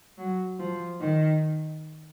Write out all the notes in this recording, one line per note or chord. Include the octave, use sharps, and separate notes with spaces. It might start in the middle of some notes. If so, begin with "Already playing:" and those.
F#3
F3
D#3